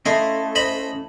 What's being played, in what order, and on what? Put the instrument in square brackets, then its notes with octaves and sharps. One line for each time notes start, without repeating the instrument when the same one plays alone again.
[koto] A3 E4 [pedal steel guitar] C#4 F5 C6 [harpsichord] D#5
[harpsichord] C5 D#5 B5